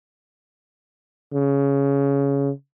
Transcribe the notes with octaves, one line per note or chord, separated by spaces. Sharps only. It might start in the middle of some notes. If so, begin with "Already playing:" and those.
C#3